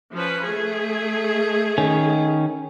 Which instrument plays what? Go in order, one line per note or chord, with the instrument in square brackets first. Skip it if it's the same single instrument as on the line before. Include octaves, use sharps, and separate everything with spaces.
[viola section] F3 C#4 B4
A3 G#4
[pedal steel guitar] D#3 C#4